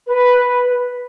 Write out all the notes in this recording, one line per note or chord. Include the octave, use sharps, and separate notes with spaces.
B4